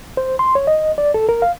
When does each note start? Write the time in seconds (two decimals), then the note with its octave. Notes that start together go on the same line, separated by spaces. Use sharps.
0.17 C5
0.39 C6
0.55 C#5
0.67 D#5
0.98 D5
1.14 A4
1.29 A#4
1.42 F5